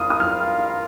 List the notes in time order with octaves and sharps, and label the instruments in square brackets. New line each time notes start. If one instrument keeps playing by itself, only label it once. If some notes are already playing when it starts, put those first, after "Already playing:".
Already playing: [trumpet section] F4 A#4 F5 [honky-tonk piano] D#6
[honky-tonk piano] D#6
F6